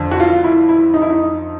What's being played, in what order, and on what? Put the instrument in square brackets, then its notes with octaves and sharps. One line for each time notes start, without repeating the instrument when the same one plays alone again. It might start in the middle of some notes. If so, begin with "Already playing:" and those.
Already playing: [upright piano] F2 D3
F#4
F4
E4
E4
D#4
E4
D#4